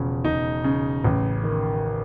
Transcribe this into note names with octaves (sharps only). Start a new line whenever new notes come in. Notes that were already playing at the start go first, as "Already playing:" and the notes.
Already playing: E1 C#3 F3
E1 D#4
C#3
A1
D#3